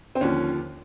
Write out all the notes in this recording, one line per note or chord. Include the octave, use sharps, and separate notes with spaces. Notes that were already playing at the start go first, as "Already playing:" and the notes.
C4
D#2 D3 F3 C#4